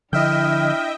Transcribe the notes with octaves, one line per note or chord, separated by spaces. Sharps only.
D3 F3 D4 E4 D#5 E5 G5 F6